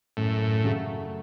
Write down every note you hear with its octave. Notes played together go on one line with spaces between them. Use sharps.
F#2 A2
C#3 F#3 A3